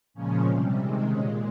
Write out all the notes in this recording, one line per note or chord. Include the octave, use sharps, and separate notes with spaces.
A#2 C#3 F3 G#3 C#4
C3 G3
C3 D#3 G#3 C4
A#2 C#3 G#3 C#4